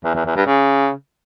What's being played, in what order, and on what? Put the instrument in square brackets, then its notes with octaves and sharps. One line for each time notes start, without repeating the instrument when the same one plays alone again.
[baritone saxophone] E2
E2
E2
G2
C#3